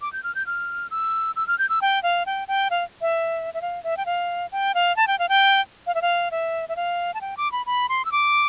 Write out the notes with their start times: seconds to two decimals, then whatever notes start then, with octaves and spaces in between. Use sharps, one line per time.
0.01 D6
0.13 G6
0.24 F6
0.35 G6
0.47 F6
0.91 E6
1.36 E6
1.47 F6
1.59 G6
1.69 E6
1.82 G5
2.03 F5
2.26 G5
2.48 G5
2.71 F5
3.01 E5
3.54 E5
3.62 F5
3.84 E5
3.97 G5
4.06 F5
4.52 G5
4.75 F5
4.96 A5
5.07 G5
5.19 F5
5.29 G5
5.87 F5
5.95 E5
6.02 F5
6.31 E5
6.69 E5
6.76 F5
7.14 A5
7.21 G5
7.37 D6
7.52 B5
7.66 B5
7.89 C6
8.05 E6
8.12 D6